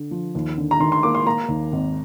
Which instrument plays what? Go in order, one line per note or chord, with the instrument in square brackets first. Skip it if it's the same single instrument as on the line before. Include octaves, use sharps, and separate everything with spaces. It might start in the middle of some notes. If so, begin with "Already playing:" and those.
Already playing: [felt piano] D3
F3
D#2
D3
[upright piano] A#5
[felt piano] D#3 [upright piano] C6
[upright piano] C6
[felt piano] A#3 [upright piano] D6
[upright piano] C6
[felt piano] A#3 [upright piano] A#5
[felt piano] D#2
G#1